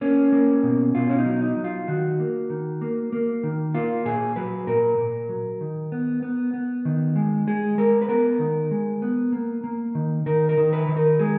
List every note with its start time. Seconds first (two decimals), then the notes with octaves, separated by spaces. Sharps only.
0.01 A#3 C#4
0.32 A#3
0.63 B2
0.95 B2 F4
1.09 C#4
1.19 D#4
1.26 F#3
1.42 D#4
1.56 F#3
1.64 F4
1.88 D#3 F#4
2.20 A#3
2.50 D#3
2.81 A#3
3.13 A#3
3.43 D#3
3.74 A#3 F4
4.05 A#2 G#4
4.36 F#3 B4
4.67 A#2 A#4
4.98 A#2
5.29 F#3
5.61 D#3
5.92 B3
6.23 B3
6.54 B3
6.85 D#3
7.16 G#3
7.47 G#3 G#4
7.78 G#3 A#4
8.02 B4
8.08 B3 A#4
8.39 D#3
8.71 G#3
9.02 B3
9.32 A#3
9.64 A#3
9.95 D#3
10.26 D#3 A#4
10.49 A#4
10.57 D#3
10.73 B4
10.88 D#3
10.97 A#4
11.19 G#3 G#4